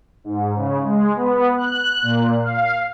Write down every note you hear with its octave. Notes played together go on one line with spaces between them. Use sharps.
G#2
C#3
G#3
B3
F#6
A#2
F5